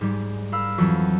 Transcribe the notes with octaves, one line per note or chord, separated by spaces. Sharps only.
G#2 G3 G#3
A#4 F5 B5 E6
F2 E3 F#3